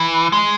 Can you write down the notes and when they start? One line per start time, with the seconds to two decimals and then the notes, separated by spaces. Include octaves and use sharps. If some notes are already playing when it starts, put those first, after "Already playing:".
Already playing: E3
0.32 G#3